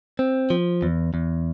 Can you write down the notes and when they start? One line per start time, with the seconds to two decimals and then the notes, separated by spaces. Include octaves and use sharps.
0.19 C4
0.50 F3
0.82 E2
1.14 E2